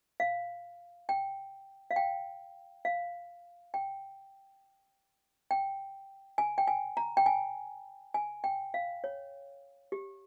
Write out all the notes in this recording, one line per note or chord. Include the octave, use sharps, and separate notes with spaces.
F5
G5
F5
G5
F5
G5
G5
G#5
G5
G#5
A#5
G5
G#5
G#5
G5
F5
C#5
G4